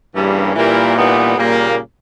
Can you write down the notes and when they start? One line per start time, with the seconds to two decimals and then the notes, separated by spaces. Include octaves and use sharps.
0.15 G2 C#3 E3 G3 A#3 C#4
0.55 A#2 E3 G3 A#3 E4 A#4
0.96 E3 G3 B3 D#4
1.37 A#2 C#3 G3 A#3